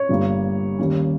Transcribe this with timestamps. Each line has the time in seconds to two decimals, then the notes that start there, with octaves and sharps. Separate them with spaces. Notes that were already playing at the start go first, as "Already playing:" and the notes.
Already playing: C#5
0.09 G1 G2 G3 A#3
0.79 D#2 D#3 G3 A#3 C#4